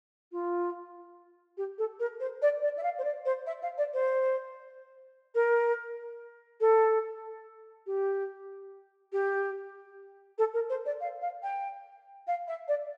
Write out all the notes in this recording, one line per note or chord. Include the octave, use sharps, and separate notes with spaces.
F4
G4
A4
A#4
C5
D5
D5
E5
F5
C5
D5
C5
E5
F5
D5
C5
A#4
A4
G4
G4
A4
A#4
C5
D5
F5
F5
G5
F5
E5
D5